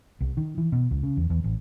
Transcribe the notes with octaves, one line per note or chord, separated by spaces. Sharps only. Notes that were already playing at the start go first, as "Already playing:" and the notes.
C2
D#3
E3
B2
C#2
C#3
E2
E2
A1